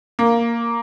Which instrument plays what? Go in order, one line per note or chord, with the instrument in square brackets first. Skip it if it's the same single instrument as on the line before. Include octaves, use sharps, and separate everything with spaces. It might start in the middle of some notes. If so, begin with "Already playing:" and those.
[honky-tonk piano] A#3